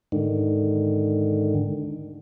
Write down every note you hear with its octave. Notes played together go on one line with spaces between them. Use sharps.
G#2 D3 D#3